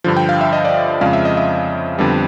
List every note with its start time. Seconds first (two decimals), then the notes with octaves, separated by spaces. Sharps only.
0.04 G2 D3 F3
0.17 G5
0.29 F5
0.41 E5
0.53 D#5
0.65 D5
0.89 D#5
1.01 F2 C#3 F3 G#3 F5
1.13 E5
1.25 D#5
1.37 E5
1.98 F2 D3 G3 B3